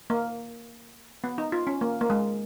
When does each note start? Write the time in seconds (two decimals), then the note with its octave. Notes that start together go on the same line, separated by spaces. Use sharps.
0.10 A#3
1.24 B3
1.38 D#4
1.52 F4
1.67 C#4
1.81 A#3
2.01 A#3
2.10 G#3